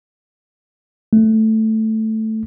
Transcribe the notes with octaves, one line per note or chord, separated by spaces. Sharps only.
A3